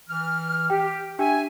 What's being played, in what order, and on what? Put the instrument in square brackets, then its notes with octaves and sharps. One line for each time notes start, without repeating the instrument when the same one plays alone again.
[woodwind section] E3 F6
[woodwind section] G4 [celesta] G5
[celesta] D4 G4 G5 [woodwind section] E5 G#5